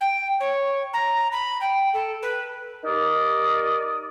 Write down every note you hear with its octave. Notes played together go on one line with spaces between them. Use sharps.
G5
C#5
A#5
B5
G5
A4
B4
D#4 G4 A#4 D5 D#6